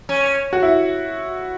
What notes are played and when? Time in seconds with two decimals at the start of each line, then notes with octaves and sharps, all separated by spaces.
0.09 C#4
0.53 F#4
0.63 E4